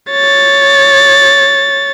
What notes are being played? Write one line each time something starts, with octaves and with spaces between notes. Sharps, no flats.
C#5 A6